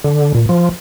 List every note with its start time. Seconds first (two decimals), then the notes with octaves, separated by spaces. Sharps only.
0.04 D3
0.34 A#2
0.49 F3